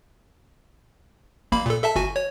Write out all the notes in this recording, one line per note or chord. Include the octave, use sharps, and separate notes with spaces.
A1 A#3 B5
A#2 A4
A4 E5 A5
G1 F#4 G#5
C#5